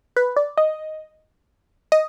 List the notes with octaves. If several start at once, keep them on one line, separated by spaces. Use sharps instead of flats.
B4
D5
D#5
D#5